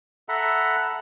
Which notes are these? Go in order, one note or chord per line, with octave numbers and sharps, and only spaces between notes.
A4 E5 F#5 A#5 B5